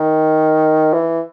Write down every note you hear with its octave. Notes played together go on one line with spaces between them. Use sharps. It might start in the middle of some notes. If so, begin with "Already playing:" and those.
Already playing: D#3
E3